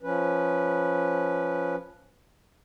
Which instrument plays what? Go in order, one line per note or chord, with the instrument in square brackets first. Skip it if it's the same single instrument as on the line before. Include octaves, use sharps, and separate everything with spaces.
[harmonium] F3 C#4 B4